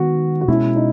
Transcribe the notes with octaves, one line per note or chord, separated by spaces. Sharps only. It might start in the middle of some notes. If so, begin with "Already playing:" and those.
Already playing: D#3 G#3 B3 F#4
F#4
B2 G#3 C#4 E4
D#4